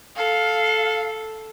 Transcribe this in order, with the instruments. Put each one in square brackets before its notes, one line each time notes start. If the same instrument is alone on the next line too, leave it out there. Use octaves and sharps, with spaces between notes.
[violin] A4 [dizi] F5